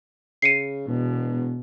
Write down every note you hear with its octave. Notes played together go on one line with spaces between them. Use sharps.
C#3 C7 C#7 D#7
E1 B2